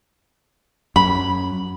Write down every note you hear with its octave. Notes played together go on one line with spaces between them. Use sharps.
F#2 B5